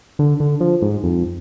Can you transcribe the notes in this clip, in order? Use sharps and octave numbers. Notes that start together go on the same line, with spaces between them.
D3
D3
F3
G#2
F2